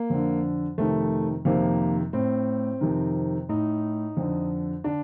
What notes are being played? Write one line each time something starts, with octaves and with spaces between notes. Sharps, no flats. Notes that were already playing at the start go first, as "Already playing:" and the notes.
Already playing: A#3
F2 D3
F2 C3 D#3 A3
F2 C3 D#3 A#3
A2 C4
F2 C3 D#3
A2 D#4
F2 D3
D3 D4